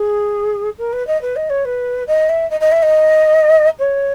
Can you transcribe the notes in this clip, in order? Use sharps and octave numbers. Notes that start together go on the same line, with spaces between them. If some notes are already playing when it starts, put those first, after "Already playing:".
Already playing: G#4
A#4
B4
D#5
B4
D#5
C#5
B4
D#5
E5
D#5
D#5
E5
D#5
C#5